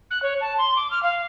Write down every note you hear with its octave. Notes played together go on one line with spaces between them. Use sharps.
F#6
C#5
A5
C6
D6
F6
F5